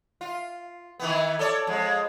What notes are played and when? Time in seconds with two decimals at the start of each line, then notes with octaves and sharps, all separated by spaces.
0.21 F4
1.00 D#3 E3 B3
1.39 A4 C#5 D5
1.67 F2 G#3